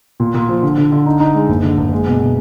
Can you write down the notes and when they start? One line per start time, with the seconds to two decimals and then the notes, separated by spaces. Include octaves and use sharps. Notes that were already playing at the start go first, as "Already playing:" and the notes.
0.20 A#2
0.34 A#2
0.49 F3
0.63 D3
0.78 D3
0.92 D3
1.06 D#4
1.20 D#4
1.35 G#3
1.49 F#1
1.63 D3
1.78 F#1
1.92 G#3
2.07 B2
2.20 B2